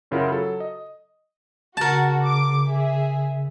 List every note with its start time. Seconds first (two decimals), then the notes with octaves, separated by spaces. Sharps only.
0.11 F#2 C#3 E4 F4 A#4 F#5
0.32 F#3 A4
0.60 D#5
1.77 C#3 F#4 A#4 A5
2.22 D6
2.68 G#4 E5